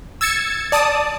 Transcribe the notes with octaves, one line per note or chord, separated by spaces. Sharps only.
E6 G#6 A6 C#7
D5 A5 D#6